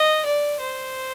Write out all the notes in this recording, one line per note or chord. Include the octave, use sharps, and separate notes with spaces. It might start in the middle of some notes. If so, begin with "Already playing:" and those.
Already playing: D#5
D5
C5